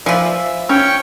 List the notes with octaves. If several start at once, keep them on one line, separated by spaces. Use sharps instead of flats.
F3 F4 B4 D5 E5 G#5
E5
C#4 C#5 G5 C#6